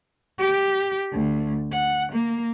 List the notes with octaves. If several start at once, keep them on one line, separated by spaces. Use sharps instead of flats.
G4
D2
F#5
A#3